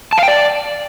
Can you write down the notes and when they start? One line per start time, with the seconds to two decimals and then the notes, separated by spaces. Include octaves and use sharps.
0.13 A5
0.18 F5
0.23 G5
0.28 D5